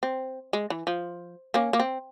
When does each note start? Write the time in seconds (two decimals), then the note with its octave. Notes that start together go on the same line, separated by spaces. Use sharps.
0.03 C4
0.53 G#3
0.70 E3
0.87 F3
1.54 A#3 C#4
1.73 A#3
1.80 C4